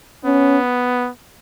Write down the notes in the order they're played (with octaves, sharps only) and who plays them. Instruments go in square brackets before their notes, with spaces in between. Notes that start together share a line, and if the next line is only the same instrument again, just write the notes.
[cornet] B3 [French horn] C#4